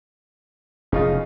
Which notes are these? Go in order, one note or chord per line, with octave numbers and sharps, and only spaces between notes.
F1 F#2 C#3 D#4 F4